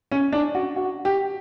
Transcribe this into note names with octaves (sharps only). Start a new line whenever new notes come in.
C#4
D4
F#4
F#4
G4